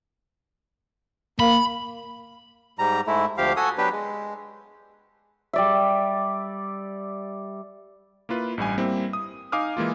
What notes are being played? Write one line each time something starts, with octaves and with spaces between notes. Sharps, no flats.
A#3 B5
G#2 G3 A#5
G#2 G#3 A3 E4
D2 F3 G4 F5
F#4 A4 G#5 D#6
F#3 B3 D4 G4 B4
G#3
G3 D5 E5
A#3 E4 F4 B4
A1 G2 G3 G#5
G3 A#3 C4 E4
D#6
D#4 F5 G#5 D6 D#6 F6
E3 G#3 A#3 F4